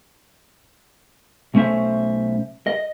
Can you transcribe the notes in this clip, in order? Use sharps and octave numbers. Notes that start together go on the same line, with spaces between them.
B1 A3 C#4 C5 E5
D#5